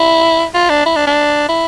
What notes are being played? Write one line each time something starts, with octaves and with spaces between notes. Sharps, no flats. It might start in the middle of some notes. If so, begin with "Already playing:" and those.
Already playing: E4
F4
D4
E4
D4
D4
E4